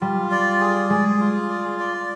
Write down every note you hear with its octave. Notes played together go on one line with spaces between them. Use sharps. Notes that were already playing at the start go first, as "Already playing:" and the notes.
G3 F4
D5
G#4
G#3 G#4
F4
D5
D5